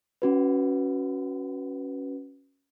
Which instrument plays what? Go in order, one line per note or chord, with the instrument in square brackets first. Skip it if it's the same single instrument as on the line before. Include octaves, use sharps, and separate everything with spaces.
[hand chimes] C#4 F#4 B4